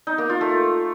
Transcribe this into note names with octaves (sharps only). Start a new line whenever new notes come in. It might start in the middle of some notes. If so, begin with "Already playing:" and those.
D#4
A#3
F4
A3